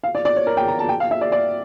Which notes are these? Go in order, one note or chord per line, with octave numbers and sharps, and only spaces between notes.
F5
D5
D5
C#5
A#4
G5
A#5
A5
G5
F5
E5
D5
D5